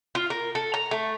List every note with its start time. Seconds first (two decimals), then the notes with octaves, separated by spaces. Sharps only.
0.15 F4
0.30 A#4
0.55 A4
0.74 A#5
0.91 A3